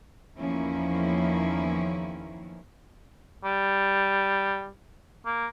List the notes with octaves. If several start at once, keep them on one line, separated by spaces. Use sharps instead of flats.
E2 D#3 F3 A#3 C#4 E4
G3
A#3